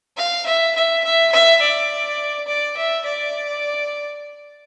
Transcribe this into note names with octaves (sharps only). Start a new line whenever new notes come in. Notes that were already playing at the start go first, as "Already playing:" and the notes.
F5
E5
E5
E5
E5
D5
D5
E5
D5